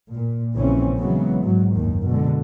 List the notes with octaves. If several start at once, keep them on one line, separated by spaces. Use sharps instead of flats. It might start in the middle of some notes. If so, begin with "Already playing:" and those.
A#2
A#1 C#3 E3 C4 C#4
C#3 E3 F#3 G#3 B3
G#2 F#3
F#1 D#2 D#3
B2 D3 G#3